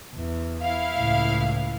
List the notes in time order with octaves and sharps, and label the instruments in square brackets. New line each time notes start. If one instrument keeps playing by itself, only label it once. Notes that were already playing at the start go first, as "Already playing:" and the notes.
[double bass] E2
[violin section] E4 F5
[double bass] C#2 A2